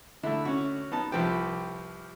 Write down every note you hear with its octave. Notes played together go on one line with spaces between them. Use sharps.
D3 A3 E4
C#4 F#4
B3 D#4 A5
C2 F3 G4 B4 G5